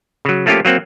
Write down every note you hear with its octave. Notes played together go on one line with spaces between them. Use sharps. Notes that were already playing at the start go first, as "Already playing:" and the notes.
C#3 F#3
F3 A3 A#3 C#4 F4 G4
F#3 A#3 C4 F#5